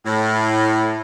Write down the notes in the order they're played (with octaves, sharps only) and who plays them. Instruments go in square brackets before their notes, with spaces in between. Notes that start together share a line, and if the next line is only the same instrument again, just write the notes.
[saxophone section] A2